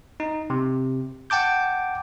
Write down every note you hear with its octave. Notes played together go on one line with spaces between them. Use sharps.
D#4
C3
F#5 G5 A5 D6 G6